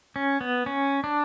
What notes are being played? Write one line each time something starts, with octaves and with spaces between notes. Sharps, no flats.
C#4
B3
C#4
D4